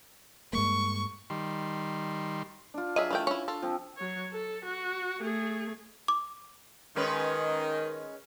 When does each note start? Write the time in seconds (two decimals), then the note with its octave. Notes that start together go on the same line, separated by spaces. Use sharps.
0.53 G2 G#3 A#3 C#6
1.30 D#3 G3 C6
2.74 D4 F4
2.96 F#3 G#4 D#5 E5
3.11 E3 A3 G5
3.27 C#4 E4 C#6
3.48 F4 A4
3.62 F3 C4
3.97 F#3 C#5
4.33 A4
4.65 F#4
5.20 A3 G#4
6.08 D6
6.96 D#3 G#3 C#4 B4